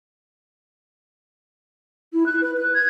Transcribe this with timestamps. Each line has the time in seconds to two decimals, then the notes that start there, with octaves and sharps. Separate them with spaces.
2.13 E4
2.26 F#6
2.42 B4
2.57 F#6
2.74 G#6